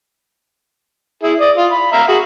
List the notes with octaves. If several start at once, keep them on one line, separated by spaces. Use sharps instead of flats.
E4 G#4
D5 D#6
F4
B5
E5 F5 A#5
F#4 G#4